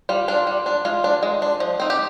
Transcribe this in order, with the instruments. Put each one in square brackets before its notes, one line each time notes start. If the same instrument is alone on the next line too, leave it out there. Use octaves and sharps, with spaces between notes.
[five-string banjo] G3 F4
D4 F4
G3
D4
G#3 F4
D4
G#3
D4
F3
C4 D#4
G4